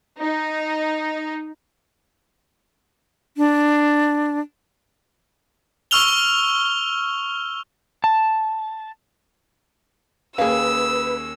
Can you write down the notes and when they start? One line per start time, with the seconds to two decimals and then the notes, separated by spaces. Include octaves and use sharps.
0.20 D#4
3.37 D4
5.91 C#6 E6 F6 F7 G7
8.04 A5
10.38 D#2 A#3 C#4 G#4 B4 F5 E6